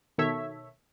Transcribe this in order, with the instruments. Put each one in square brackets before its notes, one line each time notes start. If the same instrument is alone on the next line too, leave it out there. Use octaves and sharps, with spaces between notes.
[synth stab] B2 D#3 A4 C#5 E5